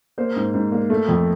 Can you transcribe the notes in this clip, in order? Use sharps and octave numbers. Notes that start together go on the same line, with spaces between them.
A#3 C5
G#2
G#2
A#3
A3
F2